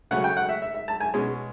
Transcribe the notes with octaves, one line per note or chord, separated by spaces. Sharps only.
C#3 F#3 A3 C#4 F#5
G5
F#5
E5
E5
E5
A5
G#5
B2 G#3 C#4